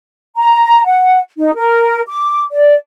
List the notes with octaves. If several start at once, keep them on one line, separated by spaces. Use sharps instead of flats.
A#5
F#5
D#4
A#4
D6
D5